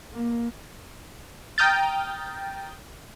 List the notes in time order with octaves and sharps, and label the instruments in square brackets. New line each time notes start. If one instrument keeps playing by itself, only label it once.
[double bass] A#3
[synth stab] G5 A#5 D#6 F6 G6 A6